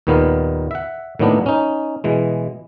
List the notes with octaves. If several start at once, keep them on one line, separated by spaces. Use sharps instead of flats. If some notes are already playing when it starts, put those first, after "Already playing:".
D#2 A#2 D#3 B3 B4 F5
E5 F#5
A2 D#3 F#3 A#3 B3 D4
C#4 D#4
B2 E3 G#3